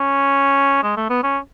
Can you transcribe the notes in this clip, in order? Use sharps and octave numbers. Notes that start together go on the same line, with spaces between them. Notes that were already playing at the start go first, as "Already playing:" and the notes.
Already playing: C#4
G#3
A3
B3
C#4